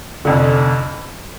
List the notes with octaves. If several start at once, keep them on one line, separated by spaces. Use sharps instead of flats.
F1 F2 D3